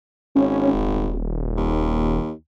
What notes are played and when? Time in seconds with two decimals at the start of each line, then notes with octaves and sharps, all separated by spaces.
0.36 G#1 C#4
0.74 D#1
1.57 D#2